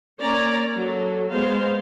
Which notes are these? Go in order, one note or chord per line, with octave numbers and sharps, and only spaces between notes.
A#3 C#4 C#5 D5 A#5
F#3 A4
G#3 B3 C5 F5